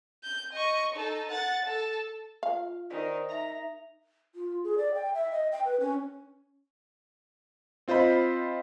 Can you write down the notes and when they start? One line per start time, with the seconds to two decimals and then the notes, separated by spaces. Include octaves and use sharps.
0.24 G6
0.53 D#5 C#6
0.94 D#4 A4
1.31 F#5 A6
1.66 A4
2.43 F4 F5
2.91 D#3 C5 D5 D#5
3.29 D#4 E5 A#5
4.35 F4
4.64 G#4
4.78 D5
4.94 G5
5.14 E5
5.31 D#5
5.52 G5
5.65 B4
5.80 C#4
7.88 C4 F4 C5 D#5 B5